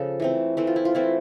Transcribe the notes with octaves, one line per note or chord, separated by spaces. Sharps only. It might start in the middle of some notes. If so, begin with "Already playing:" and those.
Already playing: C#3 F3 A4
E3 A3 C4
E3 A3 C4
F4
E4
F4
E3 A3 C4 E4